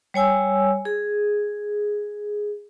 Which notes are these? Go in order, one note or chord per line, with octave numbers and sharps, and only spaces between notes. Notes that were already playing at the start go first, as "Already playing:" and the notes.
G3 C#5 G#5 E6
G#4